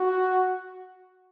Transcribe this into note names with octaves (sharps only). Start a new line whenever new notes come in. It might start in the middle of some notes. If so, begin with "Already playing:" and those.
Already playing: F#4